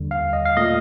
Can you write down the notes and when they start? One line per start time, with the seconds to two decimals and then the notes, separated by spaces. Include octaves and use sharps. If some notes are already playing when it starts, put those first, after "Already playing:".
Already playing: D#2 D3 G3
0.11 F5
0.33 D#5
0.46 F5
0.57 A#2 A3 D#5